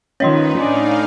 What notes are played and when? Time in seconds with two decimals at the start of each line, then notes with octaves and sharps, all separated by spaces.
0.20 D#3 F3 C#4 D#4 B4 C#5 D#5 C6
0.57 A2 D4 D#4 D5 F5 G#5